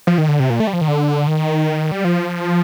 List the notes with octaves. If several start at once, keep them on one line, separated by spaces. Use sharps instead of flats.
F3
D#3
D3
C3
A#2
A3
G3
F3
D#3
D3
D#3
G3
F3